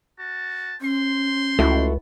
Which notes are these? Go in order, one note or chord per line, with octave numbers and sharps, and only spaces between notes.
F#4 A5
C#4 C5 C6
C#2 A3 E4 F#4